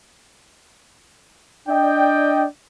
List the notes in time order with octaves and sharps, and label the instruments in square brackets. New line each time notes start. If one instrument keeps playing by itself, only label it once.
[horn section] D4 D5 D#5 G5